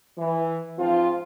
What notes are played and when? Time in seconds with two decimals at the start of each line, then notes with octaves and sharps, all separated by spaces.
0.18 E3
0.79 G#2 F3 C4 F4